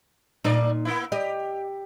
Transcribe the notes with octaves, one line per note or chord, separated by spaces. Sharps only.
A#2 A3 D#4 D5
A#3 B3 E4
G4 D#5